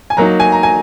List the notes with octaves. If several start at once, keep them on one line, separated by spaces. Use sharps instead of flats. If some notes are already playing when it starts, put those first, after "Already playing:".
G#5
F#3 A#3 D#4 A#5
G#5
A#5
G#5